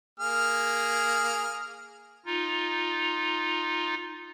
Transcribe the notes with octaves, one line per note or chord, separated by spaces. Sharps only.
A#3 G#4 F6
D#4 F4